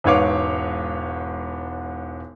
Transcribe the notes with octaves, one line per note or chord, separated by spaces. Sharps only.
E1 G#2 B4 C#5 F5 D6